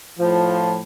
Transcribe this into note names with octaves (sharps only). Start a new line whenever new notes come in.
A2 F3